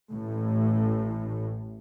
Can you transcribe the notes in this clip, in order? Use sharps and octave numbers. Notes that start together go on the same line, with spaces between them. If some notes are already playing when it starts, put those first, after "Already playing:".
A1 A2